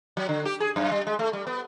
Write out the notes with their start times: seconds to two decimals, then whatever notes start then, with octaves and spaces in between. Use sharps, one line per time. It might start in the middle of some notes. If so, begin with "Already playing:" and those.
0.17 F#3
0.29 D3
0.45 G4
0.60 G#4
0.76 F#2
0.91 G3
1.07 G#3
1.19 A3
1.33 G3
1.47 B3